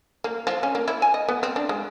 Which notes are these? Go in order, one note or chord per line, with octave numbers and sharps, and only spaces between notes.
A#3
F3
C#4
A#3
E4
G#5
D#5
B3
C4
D4
G#3